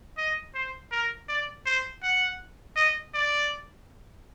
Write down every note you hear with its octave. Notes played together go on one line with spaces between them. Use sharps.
D#5
C5
A#4
D5
C5
F#5
D#5
D5